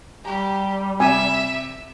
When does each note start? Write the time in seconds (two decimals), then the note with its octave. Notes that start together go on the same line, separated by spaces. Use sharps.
0.25 G3 G4 A#5
1.00 C3 E5 G#5